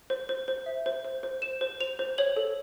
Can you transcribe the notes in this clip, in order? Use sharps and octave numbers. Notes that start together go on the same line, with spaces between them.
C5
C5
C5
E5
C5
C5
C5
C5 E7
C5
C5 F7
C5
C#5 F#7
A4